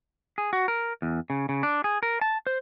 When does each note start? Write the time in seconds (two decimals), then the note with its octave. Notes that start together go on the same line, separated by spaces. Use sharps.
0.38 G#4
0.53 F#4
0.68 A#4
1.02 E2
1.30 C#3
1.49 C#3
1.63 D4
1.84 G#4
2.03 A#4
2.21 A5
2.47 C5